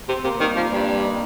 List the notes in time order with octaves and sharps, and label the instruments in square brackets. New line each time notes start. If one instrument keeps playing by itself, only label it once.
[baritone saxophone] C3 [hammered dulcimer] C4
[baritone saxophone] C3 [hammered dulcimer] A#3
[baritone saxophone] D#3 [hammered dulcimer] G3
[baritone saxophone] F3 [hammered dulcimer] A#3
[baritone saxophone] G2 [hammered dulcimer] G3
[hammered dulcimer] C4
D#4